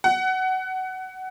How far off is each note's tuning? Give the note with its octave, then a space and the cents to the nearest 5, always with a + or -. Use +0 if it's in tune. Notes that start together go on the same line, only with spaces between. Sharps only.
F#5 +20